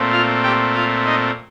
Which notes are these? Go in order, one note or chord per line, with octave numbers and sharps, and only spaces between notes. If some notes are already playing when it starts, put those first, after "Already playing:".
Already playing: A#2 A3 C4
F4 F5
G4 G5
F4 F5
D#4 D#5